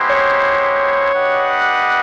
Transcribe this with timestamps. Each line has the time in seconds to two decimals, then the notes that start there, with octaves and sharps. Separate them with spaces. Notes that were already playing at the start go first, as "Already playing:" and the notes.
Already playing: G#3 B3 E4 G4 C5
0.10 C#5
1.13 D4 G4 B4 D#5 F#5